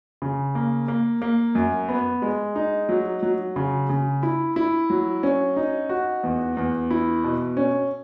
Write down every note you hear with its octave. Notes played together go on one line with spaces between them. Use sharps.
C#3
A#3
A#3
A#3
F#2
B3
G#3
D#4
F#3
F#3
C#3
C#3
E4
E4
F#3
C#4
D#4
F#4
E2
E2
E4
B2
C#4